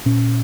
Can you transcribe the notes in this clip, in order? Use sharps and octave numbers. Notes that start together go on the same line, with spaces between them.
A#2 C#4